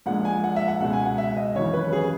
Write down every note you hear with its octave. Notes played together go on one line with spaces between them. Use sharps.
A#1 A#2 G#3 F#5
G#5
F#5
E5
F#5
C#2 B2 G#3 F#5
G#5
F#5
E5
D#5
G#1 F#2 C#3 E3 C#5
B4
G#4